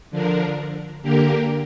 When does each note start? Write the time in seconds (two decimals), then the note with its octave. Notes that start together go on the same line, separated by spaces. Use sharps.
0.11 D3 F3 D4 A#4
1.02 D3 A#3 G4 A#4